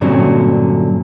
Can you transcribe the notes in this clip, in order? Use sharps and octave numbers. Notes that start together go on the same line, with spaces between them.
G2 A#2 D3 F#3 C4 C#4